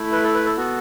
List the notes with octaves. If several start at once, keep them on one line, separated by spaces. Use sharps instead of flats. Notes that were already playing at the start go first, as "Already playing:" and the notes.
Already playing: A3 E4
B4
A4
B4
A4
B3 F#4 A4